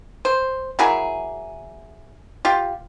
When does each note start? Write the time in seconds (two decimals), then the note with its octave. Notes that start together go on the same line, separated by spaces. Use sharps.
0.25 C5
0.79 F#3 A#3 E4 G#4
2.45 F4 G4